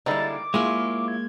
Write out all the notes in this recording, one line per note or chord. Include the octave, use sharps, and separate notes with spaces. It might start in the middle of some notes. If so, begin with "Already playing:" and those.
D3 G3 G#3 A#3 D#4 E4 A6
D6
F#3 G#3 A#3 E4 F4 G#4
G#6